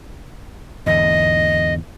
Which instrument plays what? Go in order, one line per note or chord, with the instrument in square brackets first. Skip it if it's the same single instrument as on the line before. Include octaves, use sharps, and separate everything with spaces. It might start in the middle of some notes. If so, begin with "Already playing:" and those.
[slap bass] E2 G#2 D3 [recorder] D#5